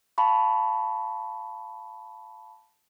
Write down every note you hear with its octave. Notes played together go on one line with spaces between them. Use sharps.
F5 A5 B5 C#6